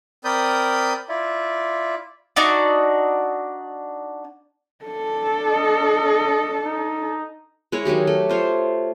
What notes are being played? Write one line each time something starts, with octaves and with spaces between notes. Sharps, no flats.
C4 A#4 D5 B5 D#6 G6
E4 F4 D5 E5
D4 D#4 F#4 D5
D4 A4
D#5
D#4
G#3 E4 C#5
D#3 F#3 G4 G#4
A3
F4 C5 C#5